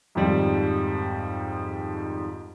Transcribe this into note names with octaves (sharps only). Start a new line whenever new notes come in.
F2 G#2 D#3 F3 G3